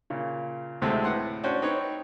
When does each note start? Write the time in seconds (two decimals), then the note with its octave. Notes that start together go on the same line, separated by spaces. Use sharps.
0.10 A#2 C#3
0.82 D2 A2 C3 G#3 A3 C4
1.04 A2 B4 F#5 C6
1.44 C#4 D4 F#4 C5 G5
1.62 C4 D#4 B4 C#5